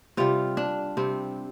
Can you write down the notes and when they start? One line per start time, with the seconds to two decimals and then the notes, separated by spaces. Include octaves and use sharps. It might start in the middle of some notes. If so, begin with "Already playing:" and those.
0.17 C3 G3 F4
0.57 D4
0.97 C3 G3 C4